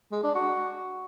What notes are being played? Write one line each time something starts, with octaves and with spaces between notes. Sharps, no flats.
G#3
D4
F#4